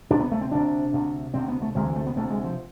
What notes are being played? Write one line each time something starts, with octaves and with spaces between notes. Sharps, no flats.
D2 C3 D4
B3
A3
C4
D2 C3 D4
D2 C3
D2 C3 C4
B3
A3
D2 C3 G#3
E3
A3
B3
D2 C3 A3
G#3
F3